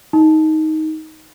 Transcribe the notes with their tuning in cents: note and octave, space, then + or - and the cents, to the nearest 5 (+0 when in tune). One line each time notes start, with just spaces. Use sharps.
D#4 +10